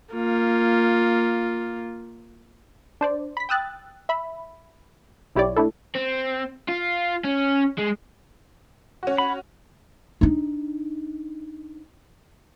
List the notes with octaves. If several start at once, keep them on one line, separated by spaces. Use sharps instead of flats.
A#3 F4
D4 C5 D5
B5 B6
G5 D#6 E6 F#6 A6
E5 B5
B1 E4 G4 C#5 D5
A3 D4 E4 A4
C4
F4
C#4
G#3
C#4 F#4
B5
D4 D#4